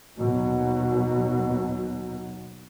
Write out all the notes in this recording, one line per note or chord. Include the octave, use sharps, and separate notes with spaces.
D#2 B2 F#3